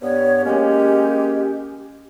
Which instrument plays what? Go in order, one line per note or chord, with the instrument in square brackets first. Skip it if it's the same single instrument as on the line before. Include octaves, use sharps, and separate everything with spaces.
[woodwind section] G2 B3 [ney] C#5
[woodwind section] G#3 A#3 C#4 [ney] G4